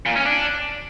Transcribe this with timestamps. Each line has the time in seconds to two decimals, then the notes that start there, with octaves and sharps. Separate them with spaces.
0.06 A#2
0.16 C#4
0.25 D4